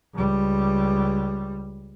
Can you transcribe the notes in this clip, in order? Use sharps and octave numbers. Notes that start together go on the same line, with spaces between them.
C#2 G3